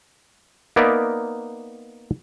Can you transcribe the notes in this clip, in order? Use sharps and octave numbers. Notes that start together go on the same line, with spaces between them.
A#3 B3 D#4 A#4 D5 E5